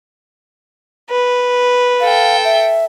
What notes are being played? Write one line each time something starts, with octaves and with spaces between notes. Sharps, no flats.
B4
A4 F5 G5
E5